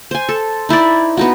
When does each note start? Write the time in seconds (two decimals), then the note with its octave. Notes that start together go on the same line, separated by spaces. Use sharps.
0.11 C5 G#5
0.29 A4
0.69 D#4 E4 C5 D5
1.17 B3 D#4 F#4